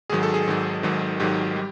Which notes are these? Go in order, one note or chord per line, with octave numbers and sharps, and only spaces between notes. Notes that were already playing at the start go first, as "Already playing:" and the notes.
G#1 G#2 D#3 F#3 G#4
A4
G#4
G#1 G#2 D#3 F#3
G#1 G#2 D#3 F#3
G#1 G#2 D#3 F#3 G4
G3